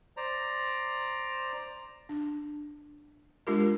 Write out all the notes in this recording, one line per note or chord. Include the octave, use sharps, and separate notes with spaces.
C5 D5 A#5
D4
G#3 D4 F4 G4 A#4